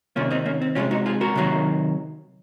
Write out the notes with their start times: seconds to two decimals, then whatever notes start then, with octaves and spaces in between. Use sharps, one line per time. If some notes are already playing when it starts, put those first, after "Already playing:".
0.16 C3 D#3 A#3 C#4 F4
0.31 C4 D#4
0.46 A#3 C#4
0.61 C4
0.75 C3 F3 G#3 C#4 F4
0.91 D#4 F#4
1.06 F4 G#4
1.21 F#4 A#4
1.36 C3 D#3 F#3 A#3